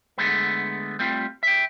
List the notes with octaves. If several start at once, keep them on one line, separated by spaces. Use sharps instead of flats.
D3 G#3 A3 B3
G3 A3 C4 F4
E5 G5